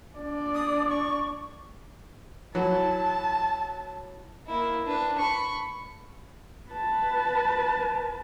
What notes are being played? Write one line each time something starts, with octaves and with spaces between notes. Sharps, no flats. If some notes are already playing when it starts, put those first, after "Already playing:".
D4 D5
D#6
C#6
E3 F#3 A5
A#3 E4
D4 B4
B5 C#6
B4 A5